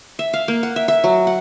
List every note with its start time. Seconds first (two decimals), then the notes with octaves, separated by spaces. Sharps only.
0.19 E5
0.33 F5
0.48 A#3
0.63 F#5
0.76 E5
0.88 E5
1.04 F#3
1.27 F#5